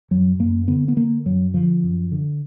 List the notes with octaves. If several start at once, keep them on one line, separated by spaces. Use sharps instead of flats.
F#2 F#3
F#2 A#3
D3 B3
B3
D3 A#3
F#2 F#3
D3 F3
F#2
D3